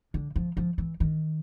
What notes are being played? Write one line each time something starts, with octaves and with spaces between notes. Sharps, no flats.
D3
F3
F3
E3
D#3